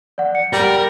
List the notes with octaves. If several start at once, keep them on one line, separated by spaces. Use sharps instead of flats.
D5 F#5
C#7
G3 A#4 A6